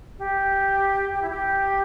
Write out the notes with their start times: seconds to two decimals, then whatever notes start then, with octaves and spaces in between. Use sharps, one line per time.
0.18 G4
1.14 G4
1.22 E4
1.29 G4